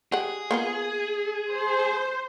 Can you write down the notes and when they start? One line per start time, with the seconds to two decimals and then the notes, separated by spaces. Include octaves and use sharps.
0.12 G4 G#4 F#5
0.51 A#3 B3 F4
1.52 C5